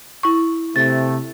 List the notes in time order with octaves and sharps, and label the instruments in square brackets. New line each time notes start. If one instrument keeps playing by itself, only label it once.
[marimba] E4 C#6
[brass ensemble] C3 A3 [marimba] A6